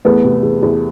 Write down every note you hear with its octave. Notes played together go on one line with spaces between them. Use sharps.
E2 A3 B3
C3
E2
E2